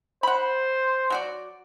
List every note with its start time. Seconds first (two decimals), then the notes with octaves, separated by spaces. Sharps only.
0.23 C5 F#5 B5
1.10 F#3 F#4 D5